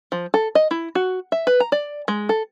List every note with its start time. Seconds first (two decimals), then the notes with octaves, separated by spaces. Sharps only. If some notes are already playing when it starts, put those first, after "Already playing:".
0.12 F3
0.34 A4
0.55 D#5
0.71 E4
0.95 F#4
1.32 E5
1.47 B4
1.60 A#5
1.72 D5
2.08 G#3
2.29 A4